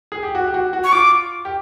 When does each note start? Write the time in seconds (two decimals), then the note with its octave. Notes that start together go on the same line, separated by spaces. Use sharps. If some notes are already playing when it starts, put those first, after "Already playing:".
0.12 G#4
0.23 G4
0.35 F#4
0.48 G4
0.54 F#4
0.73 F#4
0.84 C#6
0.92 F4 D6
1.45 G4